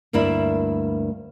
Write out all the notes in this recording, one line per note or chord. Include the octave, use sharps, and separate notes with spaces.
D2 G2 A#3 D4 E4